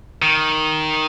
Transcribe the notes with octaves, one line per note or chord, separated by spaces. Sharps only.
D#3